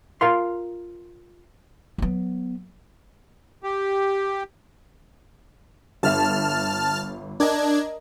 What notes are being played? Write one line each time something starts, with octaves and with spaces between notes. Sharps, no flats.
F4 A#4 F5 C6
F#3 B3
G4
G1 E5 A5 F6
D4 A#4 D#5 G#6